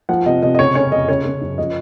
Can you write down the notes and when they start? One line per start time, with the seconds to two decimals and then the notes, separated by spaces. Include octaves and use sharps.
0.09 F3 F#5
0.26 C3 D#5
0.43 C3 D#5
0.55 D#5
0.59 C#3 C#5
0.75 C#4 C#5
0.92 F2 D#5
1.08 C#3 C#5
1.25 C#3
1.41 F#2
1.58 F3 D#5